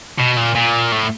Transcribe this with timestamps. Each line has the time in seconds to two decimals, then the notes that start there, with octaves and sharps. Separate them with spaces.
0.18 B2
0.36 A#2
0.55 A#2
0.92 A2